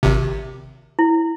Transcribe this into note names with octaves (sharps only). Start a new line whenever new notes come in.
G#1 C3
E4